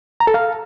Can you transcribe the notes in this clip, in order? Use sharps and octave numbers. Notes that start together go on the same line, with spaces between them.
A#5
A4
F5